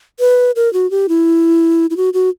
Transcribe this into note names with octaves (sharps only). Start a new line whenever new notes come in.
B4
A#4
F#4
G4
E4
E4
F#4
F#4